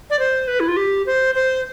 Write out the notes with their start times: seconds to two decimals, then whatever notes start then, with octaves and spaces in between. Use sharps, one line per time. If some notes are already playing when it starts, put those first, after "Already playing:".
0.10 D5
0.19 C5
0.48 B4
0.60 E4
0.68 F4
0.77 G4
1.06 C5
1.35 C5